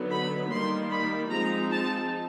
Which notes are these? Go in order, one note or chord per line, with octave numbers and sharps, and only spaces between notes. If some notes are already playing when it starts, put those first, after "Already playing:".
Already playing: D3 F#3 B3 D#4
B5
D#3 G3 A#3 C6
B5
F3 G#3 C4 D#4 A#5
A5